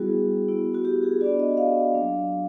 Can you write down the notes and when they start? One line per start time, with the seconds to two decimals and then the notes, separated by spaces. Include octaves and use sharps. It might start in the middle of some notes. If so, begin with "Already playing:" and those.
Already playing: G3 B3 E4 F#4 G#4
0.49 B3 E4
0.75 F#4
0.85 G4
1.03 G#4
1.21 B3 D4 F#4 D5
1.40 D#5
1.57 F5
1.94 F#3 A#3 D4